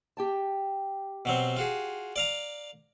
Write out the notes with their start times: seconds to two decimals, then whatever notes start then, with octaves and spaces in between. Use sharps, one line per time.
0.17 G4 G5 A5
1.25 B2 F#3 C4
1.56 F4 F#4 G#4
2.16 D5 F5 A#5